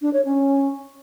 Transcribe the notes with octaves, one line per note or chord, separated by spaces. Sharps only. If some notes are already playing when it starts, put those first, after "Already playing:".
D4
C#5
C#4